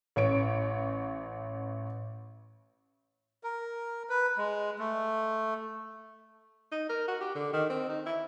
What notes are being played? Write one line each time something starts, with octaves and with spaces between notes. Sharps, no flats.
A1 C#4 C#5 D7
A#4
B4
G#3
A3
D#4
A#4
F#4
G4
D3
D#3
C4
D#4
E4